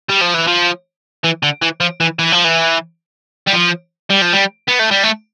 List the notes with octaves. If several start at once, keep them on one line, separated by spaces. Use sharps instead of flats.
G3
F3
E3
F3
E3
D3
E3
F3
E3
E3
F3
E3
G3
F3
G3
F3
G3
B3
A3
G3
A3